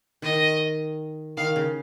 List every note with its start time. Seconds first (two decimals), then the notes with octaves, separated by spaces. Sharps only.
0.22 D#3 D#5
1.37 D#3 F5
1.56 C#3